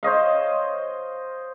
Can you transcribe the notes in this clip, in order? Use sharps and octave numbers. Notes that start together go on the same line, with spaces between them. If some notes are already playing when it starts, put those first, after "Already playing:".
C5 C#5 D#5 F5